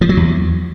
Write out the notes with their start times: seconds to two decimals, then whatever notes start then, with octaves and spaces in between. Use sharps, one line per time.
0.01 F3
0.09 F#3
0.17 E2